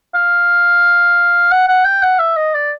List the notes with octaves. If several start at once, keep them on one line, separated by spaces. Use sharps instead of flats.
F5
F#5
F#5
G5
F#5
E5
D#5
D5